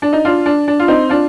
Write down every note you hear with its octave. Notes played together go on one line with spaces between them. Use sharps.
D4
D#4
D4 F4
D4
D4
F4
C4 D#4
D4 F4